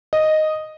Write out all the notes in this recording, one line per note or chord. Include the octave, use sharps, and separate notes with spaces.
D#5